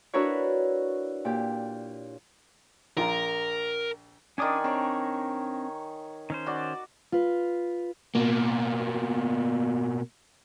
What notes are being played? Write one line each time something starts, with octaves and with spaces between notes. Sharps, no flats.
D4 E4 F#4 A#4 B4 C#5
A#2 G4
A#1 F4 A#4 A#5
D#3 C#4 D4 D5 G#5 D#6
C4 D4 C#5 A#5
D#3 C#4 C5
F#4 D5
F4 B4
B2 A#3